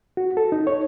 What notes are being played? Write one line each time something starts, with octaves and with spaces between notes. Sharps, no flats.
F#4
A4
D#4
C#5